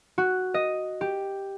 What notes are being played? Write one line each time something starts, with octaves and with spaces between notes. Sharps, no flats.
F#4
D#5
G4